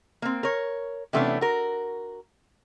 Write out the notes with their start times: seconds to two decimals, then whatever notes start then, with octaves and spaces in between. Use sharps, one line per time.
0.22 A#3 C4
0.43 A#4 C#5
1.13 C3 E3 A3 B3 C#4 D4
1.41 F#4 A#4